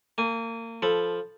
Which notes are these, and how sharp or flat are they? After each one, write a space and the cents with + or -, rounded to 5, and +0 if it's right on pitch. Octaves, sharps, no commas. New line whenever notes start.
A#3 -30 G#5 +0
F3 +0 A4 +0 B5 +0